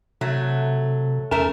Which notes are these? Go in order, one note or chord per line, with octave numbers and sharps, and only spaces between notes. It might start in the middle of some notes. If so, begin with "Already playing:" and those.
C3 F#3 A3
E2 A3 C#4 A#4 A5